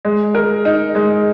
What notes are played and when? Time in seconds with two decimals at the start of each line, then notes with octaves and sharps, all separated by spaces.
0.05 G#3
0.35 A#4
0.65 D#4
0.95 G#3